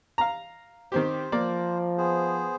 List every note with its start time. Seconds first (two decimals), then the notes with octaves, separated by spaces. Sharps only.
0.18 F5 A#5
0.92 D#3 C4 G4 C5
1.32 F3 A#3 D5
1.98 B3 G#4 C5